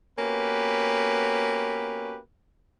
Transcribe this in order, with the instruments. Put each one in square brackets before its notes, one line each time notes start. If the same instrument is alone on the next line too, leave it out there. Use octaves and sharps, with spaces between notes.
[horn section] A#3 B3 C#4 F#4 G4 B4